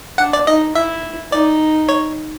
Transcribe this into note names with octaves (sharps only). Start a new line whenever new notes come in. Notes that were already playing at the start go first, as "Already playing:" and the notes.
D4 F#5
D5
D#4 D#5
E4 E5
D#4 D5
C#5